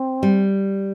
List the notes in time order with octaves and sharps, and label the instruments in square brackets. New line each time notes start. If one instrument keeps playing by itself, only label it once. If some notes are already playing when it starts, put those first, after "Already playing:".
Already playing: [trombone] C4
[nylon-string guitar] G3